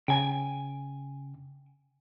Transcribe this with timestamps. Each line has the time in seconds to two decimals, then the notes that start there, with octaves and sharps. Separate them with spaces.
0.08 C#3 G5 G#5